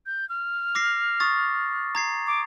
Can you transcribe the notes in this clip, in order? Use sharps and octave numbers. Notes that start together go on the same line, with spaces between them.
G6
F6
D6 A#6 C7
C#6 D#6 A6
A#5 G#6 C7
D6